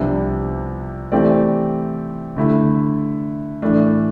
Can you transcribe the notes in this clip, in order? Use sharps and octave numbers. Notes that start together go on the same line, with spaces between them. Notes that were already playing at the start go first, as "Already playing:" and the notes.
Already playing: C2 C3 F3 B3 D4
E3 A3 C4 G4 D5
D3 A3 E4
A2 E3 A3 D4